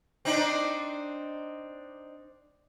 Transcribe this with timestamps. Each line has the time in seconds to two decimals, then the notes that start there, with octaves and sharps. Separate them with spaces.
0.25 C4 D4 D#4